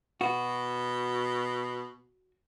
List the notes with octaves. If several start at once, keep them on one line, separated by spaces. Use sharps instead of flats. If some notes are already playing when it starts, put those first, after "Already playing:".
B2 F#4